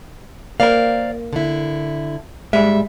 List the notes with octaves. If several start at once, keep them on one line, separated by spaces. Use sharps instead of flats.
A#3 A#4 C5 D5 F5
D3 E4
G#2 G3 G#3 E5